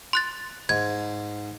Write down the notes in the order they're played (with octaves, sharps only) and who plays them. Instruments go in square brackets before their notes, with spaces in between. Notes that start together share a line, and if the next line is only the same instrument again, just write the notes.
[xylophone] C6 F#6 A6
[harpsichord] G#2 [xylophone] G#6